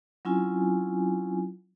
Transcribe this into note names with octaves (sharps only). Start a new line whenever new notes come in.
F#3 C4 C#4 E4 F4 G#5